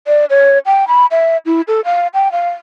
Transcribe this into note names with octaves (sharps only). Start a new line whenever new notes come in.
D5
C#5
G5
B5
E5
E4
A4
F5
G5
F5